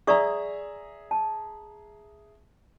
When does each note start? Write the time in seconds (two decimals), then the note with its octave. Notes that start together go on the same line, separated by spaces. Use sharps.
0.07 G#4 D5 E5 A#5 C#6 D#6
1.11 A5